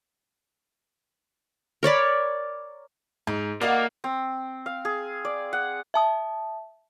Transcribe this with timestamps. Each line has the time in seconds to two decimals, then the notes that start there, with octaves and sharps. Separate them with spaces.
1.83 A#4 C#5 D5 B5
3.27 G#2 D#4
3.61 A#3 F#4 A4 B4 D5 D#5 F5
4.04 C4
4.66 F5
4.85 G#4
5.25 D5
5.53 F#5
5.94 E5 A5 D#6